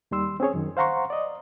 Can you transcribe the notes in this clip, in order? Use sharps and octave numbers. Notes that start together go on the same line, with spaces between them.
D#2 D#3 G3 C6 E6
C4 C#4 G#4 C#5
F#2 D#3
C5 F5 F#5 A#5 C6 C#6
D5 D#5